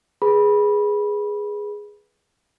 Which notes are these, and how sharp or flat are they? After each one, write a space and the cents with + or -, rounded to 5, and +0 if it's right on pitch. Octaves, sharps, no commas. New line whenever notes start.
G#4 +0 B4 -15 B5 -15